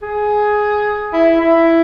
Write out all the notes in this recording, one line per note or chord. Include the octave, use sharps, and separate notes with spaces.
G#4
E4
E4